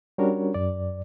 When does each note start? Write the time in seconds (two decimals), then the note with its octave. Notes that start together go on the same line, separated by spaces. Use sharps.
0.18 G3 C#4 D4 F#4 A#4 C#5
0.54 F#2 D5